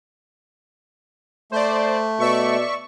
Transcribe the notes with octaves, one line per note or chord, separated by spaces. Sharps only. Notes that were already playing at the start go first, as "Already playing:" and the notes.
A3 C5 D5
B2 D5 E5 C#6